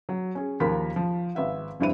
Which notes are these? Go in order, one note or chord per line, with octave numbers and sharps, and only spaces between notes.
F#3
C#4 G#4
D#2 F3 A#3 A#4 B5 B6
F3
G#1 B4 E5 F#5
F1 G2 D4 E4 C5 D#7